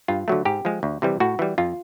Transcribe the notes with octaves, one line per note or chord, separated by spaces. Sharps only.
G2 F4
D3 F#3 A3
G#2 G4
F3 G#3
D2
C3 E3 G3
A2 F#4
E3 G3
F2 F4